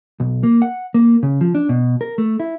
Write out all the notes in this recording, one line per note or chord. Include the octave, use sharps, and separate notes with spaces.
B1
A#3
F#5
A#3
C#3
F3
D4
B2
A#4
A3
E4